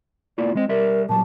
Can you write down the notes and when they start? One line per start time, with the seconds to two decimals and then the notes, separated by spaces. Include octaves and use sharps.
0.38 A#3 E4 F4 D5
0.55 G#3 C4 D#5
0.69 G3 A#4 D5 E5
1.09 A#2 F#3 G3 A5